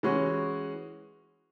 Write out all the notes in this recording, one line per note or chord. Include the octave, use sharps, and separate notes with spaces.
E3 G#3 C#4 F#4